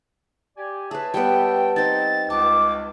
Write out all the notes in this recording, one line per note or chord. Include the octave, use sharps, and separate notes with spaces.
G4 D5 G#5
G#4 B4 C#5 E5 A5
G3 B3 G5
C4 D#4 A6
C#2 A5 D6